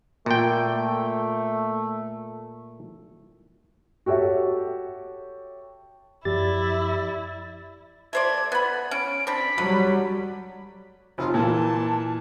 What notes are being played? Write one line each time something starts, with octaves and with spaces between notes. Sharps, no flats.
A#2 A3 G5
F#4 G4 A4 C#5 E5
F#2 F3 E4 G4 D5 A6
A3 C5 D5 G#6
B3 B5
C#4 D7
C4 D4 B5
D3 F#3 G3
F1 F4
A#2 E3 A5